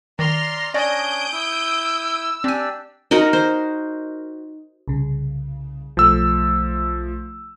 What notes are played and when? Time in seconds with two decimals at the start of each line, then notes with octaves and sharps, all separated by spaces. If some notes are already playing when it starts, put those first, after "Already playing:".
0.19 D#3 D5 A#5 C6 F6 A#6
0.74 C#4 D4 C#5 D5 D#6 G6 D7
1.32 E4 E6
2.44 C4 D4 G4 D5 G#5
3.11 D#4 F#4 A#4 D#5
3.33 C5
4.88 C2 C#3
5.97 B1 F3 A3 E6